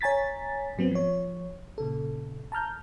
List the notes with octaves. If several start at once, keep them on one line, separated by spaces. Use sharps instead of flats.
C#5 G#5 A#5 A6 B6
G#2 F#3 B3 C4
F3 C#5
A#2 C#3 A4
A5 A#5 F6 G6